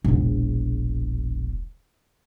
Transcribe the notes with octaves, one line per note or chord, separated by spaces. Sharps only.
E1 A#1